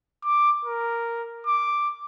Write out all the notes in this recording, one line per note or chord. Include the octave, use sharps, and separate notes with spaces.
D6
A#4
D6